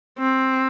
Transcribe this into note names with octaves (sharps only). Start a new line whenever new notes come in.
C4